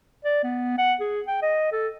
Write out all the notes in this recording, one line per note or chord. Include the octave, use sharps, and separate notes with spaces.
D5
B3
F#5
G#4
G5
D#5
A4